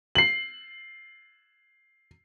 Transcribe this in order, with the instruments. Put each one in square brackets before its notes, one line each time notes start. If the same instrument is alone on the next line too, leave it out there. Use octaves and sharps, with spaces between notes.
[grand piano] C7 F#7